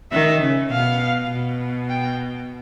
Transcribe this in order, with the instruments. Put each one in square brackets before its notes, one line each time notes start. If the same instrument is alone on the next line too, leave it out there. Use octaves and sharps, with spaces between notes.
[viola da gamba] D#3 [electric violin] E5
[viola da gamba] C#3
[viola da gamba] B2 [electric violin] F5
[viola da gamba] B2
[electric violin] G5